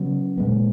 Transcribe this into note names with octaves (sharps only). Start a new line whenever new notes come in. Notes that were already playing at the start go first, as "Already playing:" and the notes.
Already playing: C#3 F#3 B3
A#2 G#3 B3